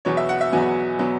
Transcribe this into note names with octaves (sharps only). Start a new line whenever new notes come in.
E2 B2 F#3 B3 C#5
E5
F#5
E5
E2 B2 F#3 B3 G#5
B2 F#3 B3